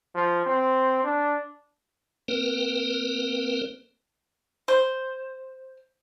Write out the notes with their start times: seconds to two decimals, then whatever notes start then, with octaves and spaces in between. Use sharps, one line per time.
0.15 F3
0.46 C4
1.04 D4
2.28 A#3 C4 A#4 B4
4.68 C5